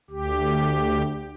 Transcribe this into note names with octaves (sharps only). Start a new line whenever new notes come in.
D2 G4